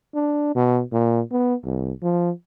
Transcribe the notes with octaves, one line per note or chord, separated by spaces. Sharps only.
D4
B2
A#2
B3
C2
F3